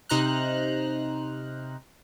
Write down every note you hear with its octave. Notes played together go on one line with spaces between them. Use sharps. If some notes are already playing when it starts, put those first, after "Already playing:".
C3 D#4 C5 A#5 F6 F#6